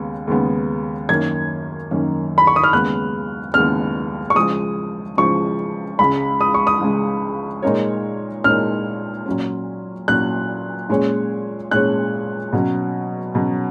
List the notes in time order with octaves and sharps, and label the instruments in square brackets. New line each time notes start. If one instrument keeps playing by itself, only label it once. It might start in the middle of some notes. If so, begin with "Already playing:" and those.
Already playing: [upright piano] D#2 C#3 G#3 B3
D#2 C#3 G#3 B3
[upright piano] F#2 D#3 A#3 C#4 [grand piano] G#6
[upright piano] F#2 D#3 A#3 C#4
[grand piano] B5
C#6
D#6
F6
[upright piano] D#2 C#3 G#3 B3 [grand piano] F#6
[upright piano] D#2 C#3 G#3 B3 [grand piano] F6
[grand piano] C#6
[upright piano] C#3 F3 G#3 [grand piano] D#6
[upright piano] C#3 F3 G#3 [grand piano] C#6
[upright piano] C#2 C#3 G#3 [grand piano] B5
[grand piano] D#6
C#6
D#6
[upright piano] C#2 C#3 G#3
A#2 G#3 D#4 A#4 C#5
[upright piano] A#2 G#3 D#4 A#4 C#5 [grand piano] F6
[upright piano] A#2 F#3 C#4
[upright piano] A#2 F#3 C#4 [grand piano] F#6
[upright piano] A#2 G#3 C#4 G#4 C#5
[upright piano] A#2 G#3 C#4 G#4 C#5 [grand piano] F#6
[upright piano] B2 F#3 C#4
B2 F#3 C#4